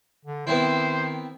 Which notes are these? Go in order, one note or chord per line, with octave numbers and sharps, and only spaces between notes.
D3
D#3 B3 C4 E4 C5